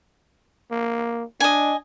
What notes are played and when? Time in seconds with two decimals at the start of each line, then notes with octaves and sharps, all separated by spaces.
0.71 A#3
1.40 D4 D#5 G#5